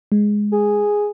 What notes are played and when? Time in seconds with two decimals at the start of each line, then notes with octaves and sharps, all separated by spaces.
0.12 G#3
0.52 G#4